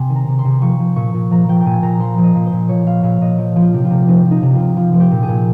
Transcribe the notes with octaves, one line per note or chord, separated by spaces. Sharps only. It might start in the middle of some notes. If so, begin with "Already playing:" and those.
Already playing: C3 G#5 C6
D#3
A#5
C3
C6
C3
F3 C#6
F3
A#2 C#6
A#2
F3 A#5
F3 G5
G5
A#2 G#5
A#2 A#5
F3 C6
F3
D#5
A#2
C5
A#2
F3 C#5
F3 F5
A#2 F5
A#2 D#5
F3
F3
F4
C3 G4
F4
C3
F3 D#4
F3 D#4
C3
F4
C3
F3 F4
F3
G4
A#2
G#4
A#2